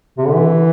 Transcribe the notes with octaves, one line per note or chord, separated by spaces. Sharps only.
C3
D3
E3